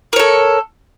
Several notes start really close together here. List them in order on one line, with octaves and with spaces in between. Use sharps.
A#4 C#5 A4